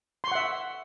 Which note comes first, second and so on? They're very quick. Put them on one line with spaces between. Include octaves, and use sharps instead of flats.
C6 C#6 F#5 E5